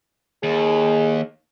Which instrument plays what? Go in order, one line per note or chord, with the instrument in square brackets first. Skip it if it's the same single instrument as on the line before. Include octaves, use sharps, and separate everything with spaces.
[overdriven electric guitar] D#2 [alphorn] G#4